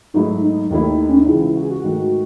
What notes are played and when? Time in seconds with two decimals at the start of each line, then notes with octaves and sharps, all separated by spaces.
0.14 G#2 F#3 A3 D#4 E4
0.43 D#4
0.70 D#2 D#3 A3 E4
1.09 C#4
1.19 D#4
1.27 C#2 C#3 E3 E4
1.56 F#4
1.63 G#4
1.70 F#4
1.84 G#2 D#3 A3 F#4